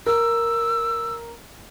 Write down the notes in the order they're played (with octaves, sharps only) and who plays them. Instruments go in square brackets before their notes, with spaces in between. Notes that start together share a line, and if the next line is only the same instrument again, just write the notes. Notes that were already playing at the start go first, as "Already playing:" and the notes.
[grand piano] A#4 [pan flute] E6